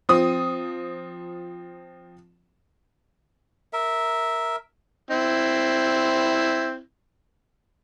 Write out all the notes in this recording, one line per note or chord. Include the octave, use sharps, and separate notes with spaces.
F3 C4 D#6
A#4 E5
C4 E4